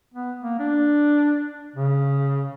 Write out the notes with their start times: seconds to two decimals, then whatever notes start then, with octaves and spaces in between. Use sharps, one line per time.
0.14 B3
0.43 A#3
0.59 D4
1.76 C#3